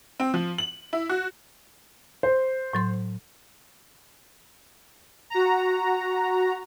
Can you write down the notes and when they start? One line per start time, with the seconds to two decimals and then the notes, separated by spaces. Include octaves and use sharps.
0.20 C4
0.34 F3
0.58 F#7
0.93 E4
1.09 F#4
2.23 C5
2.73 A2 F#3 C6
5.30 F#4 A#5